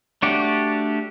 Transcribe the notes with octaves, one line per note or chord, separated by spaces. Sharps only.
A3 D4 F#4 G4 D5